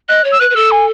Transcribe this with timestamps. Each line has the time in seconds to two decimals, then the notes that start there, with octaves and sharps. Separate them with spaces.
0.09 D#5 F#6
0.24 C#5
0.32 E6
0.40 B4 F#6
0.50 B4
0.56 A4 E6
0.71 G#5